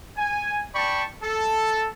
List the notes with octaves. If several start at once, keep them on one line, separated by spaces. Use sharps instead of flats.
G#5
D5 G5 A5 B5 C#6
A4